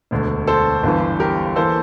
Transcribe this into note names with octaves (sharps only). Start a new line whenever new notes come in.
E1 D2 D3
A4 C5
G1 G2 E3
G4 A#4
E3 A#3 A4 C5